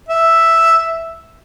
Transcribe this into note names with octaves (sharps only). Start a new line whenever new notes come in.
E5